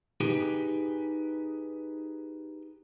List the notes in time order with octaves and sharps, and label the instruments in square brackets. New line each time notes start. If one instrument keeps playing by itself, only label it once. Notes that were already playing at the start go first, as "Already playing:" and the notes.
[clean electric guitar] D#4 G4 G#4 B4